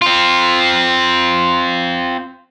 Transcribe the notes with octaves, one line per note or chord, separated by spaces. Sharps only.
C4 F4